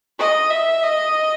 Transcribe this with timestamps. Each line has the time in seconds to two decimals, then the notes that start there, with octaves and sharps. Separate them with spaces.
0.19 D#5
0.51 E5
0.83 D#5